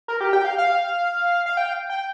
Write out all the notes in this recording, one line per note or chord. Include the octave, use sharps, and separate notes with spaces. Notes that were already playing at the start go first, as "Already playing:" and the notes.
A#4
G4
G5
F5
F5
F5
G5
G5